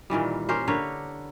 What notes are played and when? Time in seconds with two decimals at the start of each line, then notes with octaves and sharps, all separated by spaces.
0.10 A#2 D#3 E3 G3
0.49 C#4 G4 A#4 C5
0.68 D3 A#4 B4 C#5